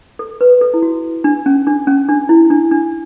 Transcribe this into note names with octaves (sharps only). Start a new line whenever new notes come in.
A4
B4
A4
E4
F#4
D4
C#4
D4
C#4
D4
E4
D4
D4